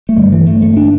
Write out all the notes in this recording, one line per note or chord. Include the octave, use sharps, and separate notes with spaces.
A3
G2 D3 G3
E3
A3
A3
D4